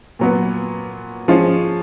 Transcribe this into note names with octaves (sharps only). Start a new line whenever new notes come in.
A#2 F#3 B3
F3 G#3 C#4 F4